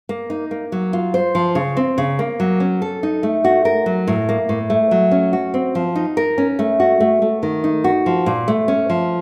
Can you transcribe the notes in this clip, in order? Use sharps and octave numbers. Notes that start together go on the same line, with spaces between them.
A#3
D#4
A#3
F#3
F4
C5
F3
C#3
C4
C#3
A#3
F#3
C#4
A4
D#4
A3
F#4
A#4
F#3
A2
A#3
A2
A3
F#3
C#4
F#4
C4
F3
D#4
A#4
C#4
A3
F#4
A3
A3
D#3
D#4
F#4
F3
A#2
A3
C#4
F3